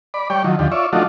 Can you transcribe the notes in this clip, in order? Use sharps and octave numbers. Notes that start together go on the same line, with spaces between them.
D5 B5
G3 C#5 D5 G5
D#3 F3 F#3
D#2 D3 F3 G4
F4 C#5 D5 E5
F3 A3 D4 D#4 F4 F#4